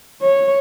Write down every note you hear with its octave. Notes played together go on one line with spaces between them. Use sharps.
C#5